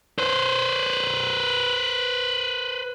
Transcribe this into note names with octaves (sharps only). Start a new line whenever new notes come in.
B4 C5